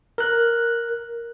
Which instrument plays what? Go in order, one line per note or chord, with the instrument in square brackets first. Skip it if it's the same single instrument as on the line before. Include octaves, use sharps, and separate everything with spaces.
[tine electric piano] A#4 F#6